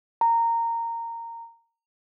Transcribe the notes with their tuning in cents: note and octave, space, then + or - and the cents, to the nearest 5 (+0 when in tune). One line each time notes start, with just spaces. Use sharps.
A#5 -15